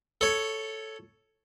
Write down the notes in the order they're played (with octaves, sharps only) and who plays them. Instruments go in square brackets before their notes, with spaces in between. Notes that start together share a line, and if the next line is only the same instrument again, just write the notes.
[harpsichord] A4 C#5